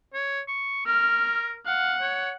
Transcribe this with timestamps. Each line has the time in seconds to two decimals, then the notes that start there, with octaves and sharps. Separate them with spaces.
0.14 C#5
0.48 C#6
0.87 A#4 F6
1.66 F5 F#5
2.01 C#5